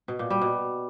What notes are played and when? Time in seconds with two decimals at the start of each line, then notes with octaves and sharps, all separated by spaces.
0.08 B2
0.19 A#2
0.30 G3
0.42 B2